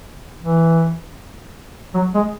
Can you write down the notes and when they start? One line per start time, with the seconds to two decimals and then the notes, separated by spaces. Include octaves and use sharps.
0.42 E3
1.94 F#3
2.15 G#3